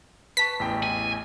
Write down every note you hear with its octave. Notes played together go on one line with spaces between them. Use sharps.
B4 A5 C#6 B6
A1 E2 G5
G#5